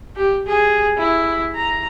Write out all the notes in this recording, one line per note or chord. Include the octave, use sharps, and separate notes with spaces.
G4
G#4
E4
A#5